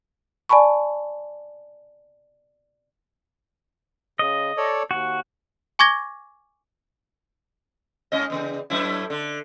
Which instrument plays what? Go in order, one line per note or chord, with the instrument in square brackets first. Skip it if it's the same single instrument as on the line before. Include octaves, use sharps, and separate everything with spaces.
[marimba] D5 G#5 A5 B5 C#6
[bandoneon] C#3 [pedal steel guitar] D#5
[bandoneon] A4 C#5 D5
[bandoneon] D#2 [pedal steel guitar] F#4
[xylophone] G#5 C#6 D6 G#6 A#6 G7
[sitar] G#2 C#4 D#5
E2 C#3
F#2 A2 E4
D3